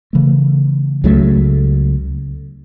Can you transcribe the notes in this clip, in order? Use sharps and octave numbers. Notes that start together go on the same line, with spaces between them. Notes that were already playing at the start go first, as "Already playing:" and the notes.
C#3 E3 A3
C#2 C#3 F#3 A3